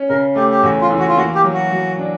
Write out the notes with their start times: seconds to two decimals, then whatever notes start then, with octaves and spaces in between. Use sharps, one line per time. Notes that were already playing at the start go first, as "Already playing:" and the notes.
Already playing: C#4
0.09 C#3 A#4
0.36 A3 G4
0.51 G4
0.63 E2 F#4
0.81 F4
0.90 E3
0.99 F#4
1.08 F4
1.17 A#3 F#4
1.35 G4
1.44 F#3
1.53 F#4
1.71 F#3
1.99 D4